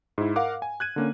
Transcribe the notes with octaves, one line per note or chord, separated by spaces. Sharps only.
G#2 E4
A#4 F5 F#5 D6
G#5
F#6 G#6 D#7
D3 A#3 C#4